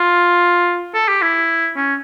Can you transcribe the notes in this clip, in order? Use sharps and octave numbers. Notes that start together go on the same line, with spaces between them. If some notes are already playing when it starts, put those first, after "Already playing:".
Already playing: F4
A4
G4
E4
C#4